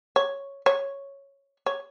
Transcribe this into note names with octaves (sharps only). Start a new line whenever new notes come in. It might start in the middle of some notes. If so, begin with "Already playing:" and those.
C#5
C#5
C#5